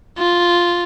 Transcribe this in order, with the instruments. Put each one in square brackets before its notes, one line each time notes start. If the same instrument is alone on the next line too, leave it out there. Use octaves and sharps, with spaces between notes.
[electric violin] F4